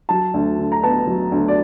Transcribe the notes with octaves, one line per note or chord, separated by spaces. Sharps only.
F#3 A5
D2
D3
A#5
B3 A5
F#3
D2
D5